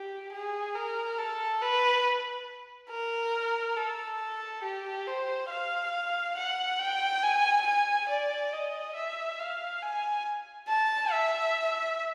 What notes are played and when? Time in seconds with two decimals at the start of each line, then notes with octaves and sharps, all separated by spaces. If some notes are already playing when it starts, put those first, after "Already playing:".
Already playing: G4
0.32 G#4
0.75 A#4
1.18 A4
1.61 B4
2.90 A#4
3.77 A4
4.63 G4
5.07 C5
5.49 F5
6.37 F#5
6.79 G5
7.22 G#5
7.66 G#5
8.09 D5
8.53 D#5
8.95 E5
9.39 F5
9.82 G#5
10.68 A5
11.12 E5